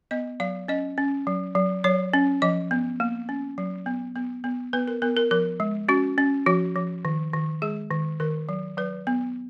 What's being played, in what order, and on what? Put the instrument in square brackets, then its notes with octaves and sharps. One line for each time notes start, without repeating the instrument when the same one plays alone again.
[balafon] B3 D#5
F#3 F5
C#4 D#5
C#4
F#3
F#3
F#3 C#5
C#4
F3 D#5
B3
A#3
C#4
F#3
B3
B3
B3
B3 B4
A#4
B3 A#4
A#4
F3 A#4
G#3
C#4 F#4
C#4
F3 F#4
F3
D#3
D#3
G#3 G#4
D#3
D#3 A#4
F#3
F#3 B4
B3